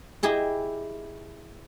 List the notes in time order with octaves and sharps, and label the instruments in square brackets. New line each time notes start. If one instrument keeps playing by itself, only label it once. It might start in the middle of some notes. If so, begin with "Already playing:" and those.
[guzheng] E4 G4 G#4 D#5